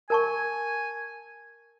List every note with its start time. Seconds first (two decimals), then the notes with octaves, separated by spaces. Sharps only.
0.10 A#4 G#5 A5 C#6